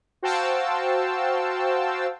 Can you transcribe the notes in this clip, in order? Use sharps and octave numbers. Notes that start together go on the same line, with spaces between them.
F#4 C5 F5 G5 A5 E6